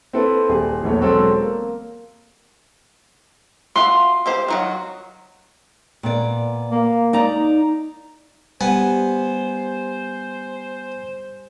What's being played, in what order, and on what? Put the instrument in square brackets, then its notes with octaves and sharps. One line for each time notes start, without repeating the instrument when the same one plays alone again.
[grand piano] C4 E4 A4 B4
D#1 G#4
A#1 E2 A3 C#5
E1 F#3 C4 A4 E6
A#3
[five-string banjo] F4 F#4 E5 [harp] C6
[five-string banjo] C4 G4 C5
D#3 F#3 F#4
[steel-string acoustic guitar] A#2 B3 D5
[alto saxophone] A#3
[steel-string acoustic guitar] D#4 D5 A#5
[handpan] G3 [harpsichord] B3 [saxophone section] C5 [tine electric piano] G#5